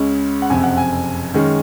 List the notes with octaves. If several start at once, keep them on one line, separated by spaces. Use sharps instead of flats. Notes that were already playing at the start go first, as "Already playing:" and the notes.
Already playing: C#2 C#3 G#3 C#4
F#5
F#1 F2 C3 G#5
F#5
G#5
F#2 D#3 G#3 C#4